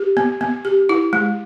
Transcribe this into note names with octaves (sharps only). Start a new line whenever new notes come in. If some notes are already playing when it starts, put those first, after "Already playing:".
Already playing: G4
B3
B3
G4
E4
G#3